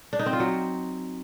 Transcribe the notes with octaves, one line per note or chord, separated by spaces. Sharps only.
D4
D#4
C4
F4
F#3